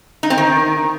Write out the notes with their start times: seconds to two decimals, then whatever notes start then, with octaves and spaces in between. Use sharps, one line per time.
0.23 D#4
0.30 C4
0.38 D#3